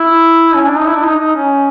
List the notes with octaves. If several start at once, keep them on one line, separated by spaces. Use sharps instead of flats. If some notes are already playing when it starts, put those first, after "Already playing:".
Already playing: E4
C#4
D4
D#4
E4
D4
D#4
D#4
C#4